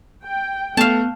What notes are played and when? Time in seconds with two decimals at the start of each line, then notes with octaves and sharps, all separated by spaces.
0.24 G5
0.77 A3 B3 F5 A5